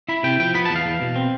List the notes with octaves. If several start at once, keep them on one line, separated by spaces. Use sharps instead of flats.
E4 B5
C3 G5
F3 G5
B3 B5
A5
E2
F5
E2
B2
C4